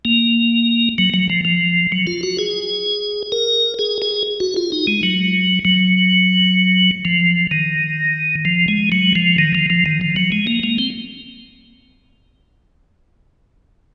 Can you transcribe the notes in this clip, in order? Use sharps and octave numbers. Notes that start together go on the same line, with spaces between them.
A#3
F#3
F#3
F3
F3
F#3
F4
F#4
G#4
A#4
G#4
G#4
F#4
F4
D#4
G#3
F#3
F#3
F3
D#3
F3
G#3
F#3
F3
D#3
F3
F3
D#3
F3
F#3
G#3
A#3
A#3
C4